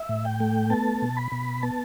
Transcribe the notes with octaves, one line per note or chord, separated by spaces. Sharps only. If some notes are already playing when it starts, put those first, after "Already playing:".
Already playing: E5
A2
G5
A3
B3 A5
B2
B5
B2
B3 A5